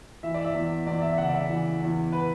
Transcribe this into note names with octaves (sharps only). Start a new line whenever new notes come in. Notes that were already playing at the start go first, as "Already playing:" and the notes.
E3 E5
D5
E5
E2
E2 D5
E5
E5
C#3 F#5
D5
E5
E3
E2
B4